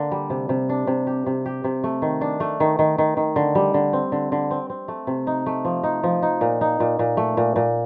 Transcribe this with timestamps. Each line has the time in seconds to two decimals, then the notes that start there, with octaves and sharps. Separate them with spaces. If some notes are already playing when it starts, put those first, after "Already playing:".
Already playing: D3 A#3
0.12 G3
0.30 C3
0.49 C3
0.69 D4
0.87 C3
1.07 G4
1.26 C3
1.46 G4
1.64 C3
1.84 A3
2.02 D#3
2.21 D4
2.40 A3
2.60 D#3
2.79 D#3
2.98 D#3
3.17 D#3
3.36 D3
3.55 G3
3.74 D3
3.93 C4
4.12 D3
4.32 D3
4.51 C4
4.70 C4
4.88 A3
5.07 C3
5.27 D#4
5.46 A3
5.65 F3
5.84 D#4
6.03 F3
6.23 D#4
6.41 A#2
6.61 D#4
6.80 A#2
6.99 A#2
7.17 A3
7.37 A#2
7.56 A#2